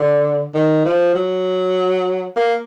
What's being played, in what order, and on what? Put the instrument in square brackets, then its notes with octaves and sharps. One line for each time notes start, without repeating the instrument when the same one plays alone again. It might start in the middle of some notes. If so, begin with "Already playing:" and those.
Already playing: [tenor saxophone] D3
D#3
F3
F#3
A#3